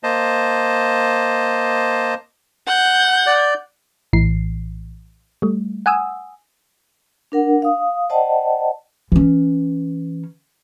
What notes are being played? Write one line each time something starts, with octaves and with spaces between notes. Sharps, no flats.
A#3 C5 D#5 A5
F#5 G6
D5
A#1 A2 E3 C7
G3 A3
F#5 G#5 D#6 E6
D4 A#4 F#5
F5 D#6
C5 D5 D#5 F#5 G5 A5
E3 C#4